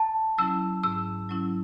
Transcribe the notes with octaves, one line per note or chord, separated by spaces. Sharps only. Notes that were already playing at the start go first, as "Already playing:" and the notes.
Already playing: A5
F#3 C#4 E4 E6
G#2 E6
F#3 C#4 E4